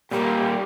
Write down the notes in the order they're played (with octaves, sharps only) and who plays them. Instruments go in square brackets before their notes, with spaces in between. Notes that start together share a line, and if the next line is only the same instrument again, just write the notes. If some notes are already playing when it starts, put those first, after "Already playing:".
[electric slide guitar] A#2 G3 A#3 [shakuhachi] G4